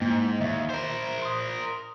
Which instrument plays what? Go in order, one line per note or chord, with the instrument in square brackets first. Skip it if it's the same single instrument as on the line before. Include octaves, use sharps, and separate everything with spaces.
[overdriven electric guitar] G#2 [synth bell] A#3
[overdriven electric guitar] D#2 [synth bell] E5
[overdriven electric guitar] A#4 C5
[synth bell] C6 D#6